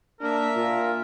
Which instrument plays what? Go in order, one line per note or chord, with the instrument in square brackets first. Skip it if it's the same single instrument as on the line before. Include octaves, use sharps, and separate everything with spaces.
[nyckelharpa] A#3 E5 [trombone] D4 [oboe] A#4
[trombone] A#2 [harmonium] F4